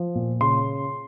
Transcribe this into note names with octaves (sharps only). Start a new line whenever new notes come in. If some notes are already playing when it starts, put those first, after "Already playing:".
Already playing: F3
A#2
C#3 C6